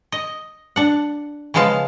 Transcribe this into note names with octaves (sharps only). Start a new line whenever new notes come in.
D#5
D4 F#5
C#3 F3 G#3 B3 F5 A5